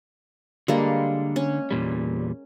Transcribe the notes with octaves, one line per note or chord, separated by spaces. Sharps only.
D3 G3 G#3 A#3
C#4
E2 A#2 G3